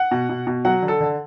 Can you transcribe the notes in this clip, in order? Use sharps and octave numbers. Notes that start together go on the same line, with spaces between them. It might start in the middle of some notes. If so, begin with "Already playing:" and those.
Already playing: F#5
B2
B2
B2
F#3 F#5
D3
A4
D3